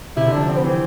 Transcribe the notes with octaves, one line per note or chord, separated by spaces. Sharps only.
C3 E4
D3
F3 D4
C4
B3
E3 C4